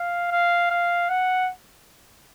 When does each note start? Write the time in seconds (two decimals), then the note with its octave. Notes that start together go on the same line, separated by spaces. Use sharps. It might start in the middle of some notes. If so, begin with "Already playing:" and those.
Already playing: F5
0.31 F5
0.71 F5
1.09 F#5